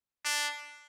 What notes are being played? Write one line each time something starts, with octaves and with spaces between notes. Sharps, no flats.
D4